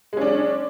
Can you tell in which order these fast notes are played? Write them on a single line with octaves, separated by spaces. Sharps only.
G#3 C#4 D4